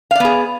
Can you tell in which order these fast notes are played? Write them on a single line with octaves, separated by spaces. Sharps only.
F5 D5 B3 G#4